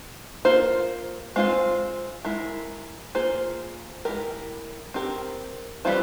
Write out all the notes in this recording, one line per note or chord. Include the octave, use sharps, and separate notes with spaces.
A#3 F4 C5
G#3 C4 F4 C5
G#3 E4 A#4
A#3 F4 G#4 C5
G#3 E4 G4 A#4
C4 G4 A#4
E3 G3 C4 F4 C5